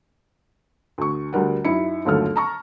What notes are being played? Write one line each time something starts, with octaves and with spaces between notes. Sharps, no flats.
D2 C#6
D2 G3 A#4 F#5
F#2 D#4 E4 C#7
G1 D#2 F#3 A3 A4 F6
A5 A#5 C#6